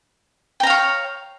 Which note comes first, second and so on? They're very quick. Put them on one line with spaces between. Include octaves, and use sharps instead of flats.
G5 A#5 F5 C#5